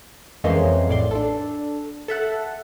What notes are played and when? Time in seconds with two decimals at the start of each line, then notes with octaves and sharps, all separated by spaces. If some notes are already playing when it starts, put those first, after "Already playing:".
0.44 F2 E3 G#3 A#3 C#4 C6
0.89 A1 D5 C6
1.11 D4 A4
2.08 A4 E5 F#5